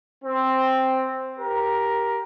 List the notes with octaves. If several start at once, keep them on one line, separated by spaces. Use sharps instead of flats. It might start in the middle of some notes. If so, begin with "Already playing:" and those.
C4
G4 A#4